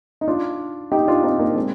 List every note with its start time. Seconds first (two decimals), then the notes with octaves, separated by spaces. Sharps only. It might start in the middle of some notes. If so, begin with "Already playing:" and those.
0.21 D#4
0.28 D4 F4
0.92 D#4 G4
1.08 D4 F4
1.23 C4 D#4
1.39 A#3 D4
1.56 G#3 C4